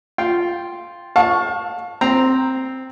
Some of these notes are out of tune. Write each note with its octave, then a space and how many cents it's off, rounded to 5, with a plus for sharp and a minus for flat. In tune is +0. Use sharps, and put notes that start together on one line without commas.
F4 +0 G5 +0
F5 +35 A5 +0 C#6 +0
C4 +0 A#5 +0